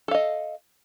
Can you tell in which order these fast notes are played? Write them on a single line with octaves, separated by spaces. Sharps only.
A4 F5 D#5